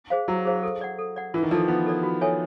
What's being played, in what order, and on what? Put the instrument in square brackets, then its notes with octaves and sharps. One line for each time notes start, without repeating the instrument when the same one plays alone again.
[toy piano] G#4 C5 F5
[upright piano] F#3 [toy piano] E4
[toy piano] G#4 C5 F5
A4
D5 F#5
A4
D5 F#5
[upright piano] E3 [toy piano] F4
[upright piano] D#3
[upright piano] F3 [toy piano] A4 D5
[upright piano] B3 [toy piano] F4
[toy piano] A4 D5
F#4
A4 C#5 E5 G#5